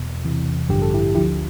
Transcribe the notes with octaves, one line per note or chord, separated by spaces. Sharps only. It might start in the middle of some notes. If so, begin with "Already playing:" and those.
Already playing: E2 B2
E2 C3 E3
A1 G2 D3 F3 G4
A4
E4 G4
D2 D3 F3 E4 G4